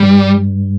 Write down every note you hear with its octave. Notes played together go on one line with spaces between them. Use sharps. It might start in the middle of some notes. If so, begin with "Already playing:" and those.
Already playing: G2 G3